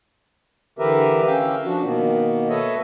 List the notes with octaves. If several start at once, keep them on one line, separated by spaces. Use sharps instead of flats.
D3 E3 G4 A#4 B4 E5
C#4 E5 F5 G5
F3 D4 F#4
B2 D#3 A#3 B3
A4 B4 C#5 D#5 E5